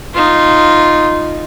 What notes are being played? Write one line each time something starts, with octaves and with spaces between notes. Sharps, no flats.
D#4 F4